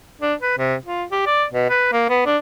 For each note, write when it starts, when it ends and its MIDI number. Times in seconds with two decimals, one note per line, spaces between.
0.21 0.34 62
0.41 0.55 71
0.58 0.75 48
0.85 1.04 65
1.11 1.21 67
1.26 1.44 74
1.52 1.68 47
1.69 1.89 71
1.92 2.09 58
2.09 2.22 59
2.26 2.37 62